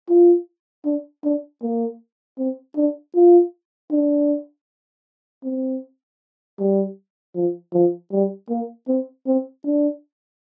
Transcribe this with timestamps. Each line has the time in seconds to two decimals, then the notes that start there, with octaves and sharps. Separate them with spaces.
0.09 F4
0.85 D4
1.24 D4
1.62 A#3
2.38 C4
2.76 D4
3.15 F4
3.91 D4
5.43 C4
6.59 G3
7.35 F3
7.73 F3
8.12 G3
8.49 A#3
8.88 C4
9.26 C4
9.65 D4